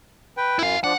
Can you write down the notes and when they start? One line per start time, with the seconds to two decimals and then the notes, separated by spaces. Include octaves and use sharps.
0.37 B4 G5
0.59 F#2 E4 F5
0.84 F3 D4 F#5